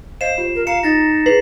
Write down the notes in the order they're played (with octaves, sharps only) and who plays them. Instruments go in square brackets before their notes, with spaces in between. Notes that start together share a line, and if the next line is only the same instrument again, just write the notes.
[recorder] C5 [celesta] D#5 F5 [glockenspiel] C7 E7
[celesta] F4 G4
[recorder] A#4
[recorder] F5 [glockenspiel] A#5 C#7 E7
[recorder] D#4 [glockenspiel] A6 A#6
[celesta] E4 G#4 [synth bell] B4 [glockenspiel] C7